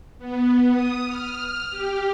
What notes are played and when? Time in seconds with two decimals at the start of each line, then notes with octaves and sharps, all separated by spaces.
0.19 B3
0.69 D#6
1.04 F6
1.70 G4